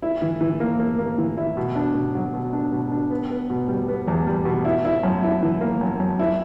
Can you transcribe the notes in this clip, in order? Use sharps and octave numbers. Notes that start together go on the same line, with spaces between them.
E4
E3
E3
A#3
A#3
A#3
E3
E4
B2
D4
B2
F#3
B2
D4
B2
D4
B3
B3
B2
G3
B3
E2
G3
B2
E4
E4
F#2
E4
E3
A#3
F#2
F#2
E4